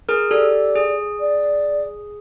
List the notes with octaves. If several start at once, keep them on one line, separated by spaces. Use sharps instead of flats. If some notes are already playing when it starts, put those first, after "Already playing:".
G#4 A#4
G4 A4 D5
G#4
D5